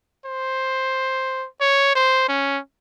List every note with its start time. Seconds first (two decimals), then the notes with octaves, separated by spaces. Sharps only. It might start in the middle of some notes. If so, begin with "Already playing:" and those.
0.26 C5
1.61 C#5
1.96 C5
2.29 C#4